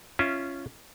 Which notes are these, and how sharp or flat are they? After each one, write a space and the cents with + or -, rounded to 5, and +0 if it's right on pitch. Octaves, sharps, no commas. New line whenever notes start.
C#4 +0 F4 -20 E5 -20